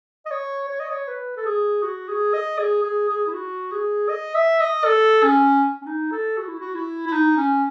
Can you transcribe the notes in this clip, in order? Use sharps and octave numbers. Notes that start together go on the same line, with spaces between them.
D#5
C#5
C#5
D#5
C#5
B4
A4
G#4
F#4
G#4
D#5
G#4
G#4
G#4
E4
F#4
G#4
D#5
E5
D#5
A4
C#4
C#4
D#4
A4
F#4
E4
F#4
E4
E4
D#4
C#4